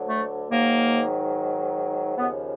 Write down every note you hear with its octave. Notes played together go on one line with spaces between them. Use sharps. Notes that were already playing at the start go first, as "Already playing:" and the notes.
Already playing: D2 D3 F#3
A3
G#2 D#3 F#3 A#3
D#2 C#3 F3 B3